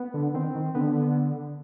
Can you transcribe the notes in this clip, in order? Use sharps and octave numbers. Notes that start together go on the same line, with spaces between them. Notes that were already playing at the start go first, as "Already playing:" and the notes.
Already playing: B3
D3
D#3 C4
D#3
D3 B3